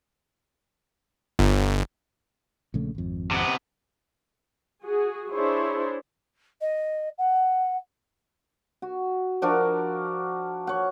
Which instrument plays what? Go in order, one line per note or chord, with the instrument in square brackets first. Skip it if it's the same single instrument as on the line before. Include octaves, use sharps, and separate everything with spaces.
[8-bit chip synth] G1
[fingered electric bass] A#1 C#3 A3
G#1 F2
[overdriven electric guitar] C3 B3
[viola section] F#4 G#4
D4 E4 G#4 C5 C#5
[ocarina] D#5
F#5
[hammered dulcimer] F#4
F3 D4 F#4 A#4
C#5 F#5